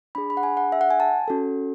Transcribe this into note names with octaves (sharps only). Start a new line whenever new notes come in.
D4 G#4 B5
B5
F#5
G#5
F#5
E5
F#5
G#5
A5
C#4 F#4 A4